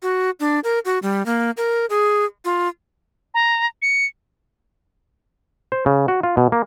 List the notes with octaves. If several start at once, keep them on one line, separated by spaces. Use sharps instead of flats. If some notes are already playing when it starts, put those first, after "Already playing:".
F#4
D4
A#4
F#4
G3
A#3
A#4
G#4
F4
A#5
C#7
C5
C#3
F#4
F4
B2
A#3